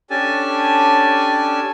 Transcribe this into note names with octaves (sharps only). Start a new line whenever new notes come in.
C#4 D4 G4 A4 G#5 A5